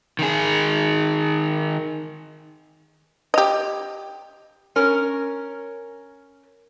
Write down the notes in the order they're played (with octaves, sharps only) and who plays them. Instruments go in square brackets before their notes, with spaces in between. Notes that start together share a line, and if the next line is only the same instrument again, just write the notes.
[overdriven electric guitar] D#3 G#4
[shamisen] G4 D#5
[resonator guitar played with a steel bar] C#4 A#4